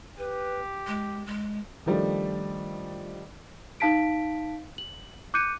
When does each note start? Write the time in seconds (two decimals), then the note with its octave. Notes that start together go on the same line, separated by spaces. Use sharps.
0.18 G4 B4
0.87 G#3
1.27 G#3
1.86 D#3 F3 G3 A3 D4
3.80 D#4 F5 A5 B6 D7
4.78 F#7
5.34 D6 F#6 G6 C#7 D#7